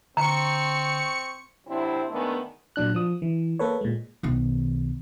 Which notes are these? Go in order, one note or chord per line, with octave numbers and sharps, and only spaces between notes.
D3 C4 A#5 C#6 C#7
C3 F#3 C4 D4 E4
D#3 G#3 A3 B3 C#4 D4
A#2 F#3 D4 F#6
F3 D#6
E3
A#3 A4 B4 C#5
A#2 G#3
B1 D#3